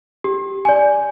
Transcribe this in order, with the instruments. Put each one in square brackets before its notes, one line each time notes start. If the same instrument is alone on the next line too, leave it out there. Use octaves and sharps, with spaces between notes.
[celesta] G4
D5 G#5